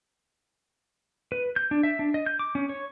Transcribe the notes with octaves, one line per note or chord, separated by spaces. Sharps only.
B4
G6
D4
E5
D4
D#5
G6
D6
C#4
C#5